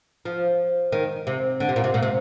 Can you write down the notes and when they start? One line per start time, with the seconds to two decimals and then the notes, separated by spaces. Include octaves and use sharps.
0.25 F3
0.92 D#3
1.27 C3
1.60 D3
1.69 C3
1.76 A#2
1.84 C3
1.94 A#2
2.03 C3